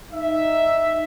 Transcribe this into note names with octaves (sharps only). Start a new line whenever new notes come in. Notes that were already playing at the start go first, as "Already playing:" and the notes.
D#4 E5